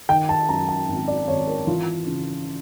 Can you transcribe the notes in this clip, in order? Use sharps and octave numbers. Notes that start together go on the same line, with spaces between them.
D#3 G5
A5
F#2 A#5
A5
G#1
D5
G#1 C#5
A#4
E3 F4
C#3